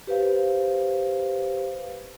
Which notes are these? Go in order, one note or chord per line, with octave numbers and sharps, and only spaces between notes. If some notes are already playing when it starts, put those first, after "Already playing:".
G4 B4 C5 F5